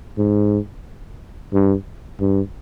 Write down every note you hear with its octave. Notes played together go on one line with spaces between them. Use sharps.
G#2
G2
G2